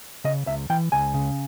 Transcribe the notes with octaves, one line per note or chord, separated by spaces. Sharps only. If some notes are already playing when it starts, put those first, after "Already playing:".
C#3 D#5
C#2 E5
E3 G5
C#2 G#5
C#3